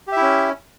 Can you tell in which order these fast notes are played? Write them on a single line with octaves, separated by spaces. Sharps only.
G4 E5 E4 C#4